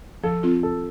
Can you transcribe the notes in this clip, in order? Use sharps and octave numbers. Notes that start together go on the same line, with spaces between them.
F3 A4
C4 F4
F3 A4